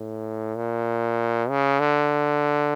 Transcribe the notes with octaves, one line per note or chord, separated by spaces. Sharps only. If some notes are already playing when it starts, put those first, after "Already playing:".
Already playing: A2
A#2
C#3
D3